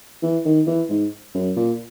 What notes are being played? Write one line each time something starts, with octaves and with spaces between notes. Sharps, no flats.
E3
D#3
E3
G#2
F#2
A#2